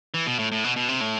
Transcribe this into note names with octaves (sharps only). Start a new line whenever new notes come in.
E3
B2
A2
A2
B2
B2
C3
A2